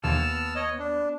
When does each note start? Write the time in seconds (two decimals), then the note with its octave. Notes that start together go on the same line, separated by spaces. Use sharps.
0.04 D#2 B2 D3 E3 A5 E6 F6
0.16 B3
0.56 C#5 D#5
0.79 D4